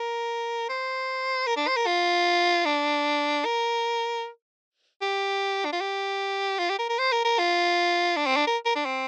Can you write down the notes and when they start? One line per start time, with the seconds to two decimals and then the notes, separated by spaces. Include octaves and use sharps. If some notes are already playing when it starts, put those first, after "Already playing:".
Already playing: A#4
0.69 C5
1.47 A#4
1.57 D4
1.68 C5
1.76 A#4
1.86 F4
2.66 D4
3.45 A#4
5.02 G4
5.65 D4
5.73 F4
5.81 G4
6.59 F4
6.70 G4
6.79 A#4
6.89 A#4
6.99 C5
7.12 A#4
7.25 A#4
7.39 F4
8.17 D4
8.26 C4
8.36 D4
8.47 A#4
8.65 A#4
8.75 D4
8.85 C4